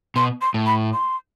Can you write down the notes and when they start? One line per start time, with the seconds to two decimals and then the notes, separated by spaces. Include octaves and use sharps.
0.16 B2 C6
0.41 C6
0.54 A2
0.66 B5
0.93 C6